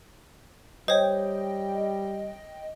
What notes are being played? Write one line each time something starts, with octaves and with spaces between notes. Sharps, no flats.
G3 C5 C#5 D#5 G5